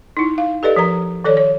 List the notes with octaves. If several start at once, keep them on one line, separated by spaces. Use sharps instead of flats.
D#4 E4
F5
G4 A4 B4 D5 D#5
F3 A#4 A#5
D#3 A4 C#5 D5
C#5